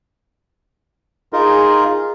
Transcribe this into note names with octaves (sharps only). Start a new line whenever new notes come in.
D#4 F4 G#4 A#4